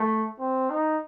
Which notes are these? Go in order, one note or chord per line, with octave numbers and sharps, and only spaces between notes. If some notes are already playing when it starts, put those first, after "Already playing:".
Already playing: A3
C4
D#4